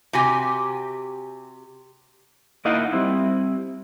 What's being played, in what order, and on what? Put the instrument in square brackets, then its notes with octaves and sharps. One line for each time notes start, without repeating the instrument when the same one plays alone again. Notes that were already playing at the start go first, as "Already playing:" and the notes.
[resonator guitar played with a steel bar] C3 F#4 G4 G#5
[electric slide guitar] A#3 D#4 E4 D#5 F5 F#5
G3 C4 E4